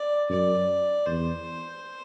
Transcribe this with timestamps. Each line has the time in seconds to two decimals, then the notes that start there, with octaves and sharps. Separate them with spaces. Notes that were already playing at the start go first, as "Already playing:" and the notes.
Already playing: D5
0.29 F#2 D5
1.06 E2 C5